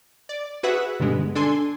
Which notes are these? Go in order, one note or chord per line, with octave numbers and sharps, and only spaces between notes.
D5
F#4 G#4 B4 E5 F#5
G2 B2 D3 G#3 B3
D4 A4 G#5 C6